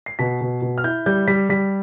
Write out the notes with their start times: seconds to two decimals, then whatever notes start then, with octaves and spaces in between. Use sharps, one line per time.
0.06 C7
0.19 B2 B6
0.41 B2
0.62 B2
0.78 F6
0.84 E4 G6
1.06 G3 G6
1.28 G3 B6
1.49 G3 B6